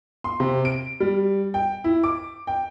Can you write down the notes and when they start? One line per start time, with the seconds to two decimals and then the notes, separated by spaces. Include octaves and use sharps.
0.24 C6
0.40 C3
0.65 D7
1.00 G3
1.54 G5
1.84 E4
2.03 D6
2.47 G5